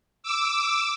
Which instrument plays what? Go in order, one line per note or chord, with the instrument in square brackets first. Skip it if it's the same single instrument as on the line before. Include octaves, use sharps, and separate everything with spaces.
[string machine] D6 E6